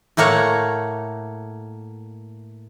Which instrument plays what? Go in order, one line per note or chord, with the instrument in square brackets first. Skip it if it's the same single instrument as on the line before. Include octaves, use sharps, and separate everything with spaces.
[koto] A2 A3 A#3 C#5 F#5 A#5